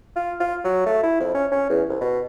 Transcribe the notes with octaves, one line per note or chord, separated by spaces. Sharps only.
F4
F4
F#3
A3
E4
F2
C#4
C#4
E2
C2
B2